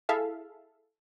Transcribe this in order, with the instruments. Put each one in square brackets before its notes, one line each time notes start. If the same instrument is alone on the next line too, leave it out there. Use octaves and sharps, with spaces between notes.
[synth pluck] E4 G#4 A4 E5 F5